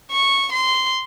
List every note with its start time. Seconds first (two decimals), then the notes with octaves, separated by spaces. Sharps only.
0.11 C#6
0.53 C6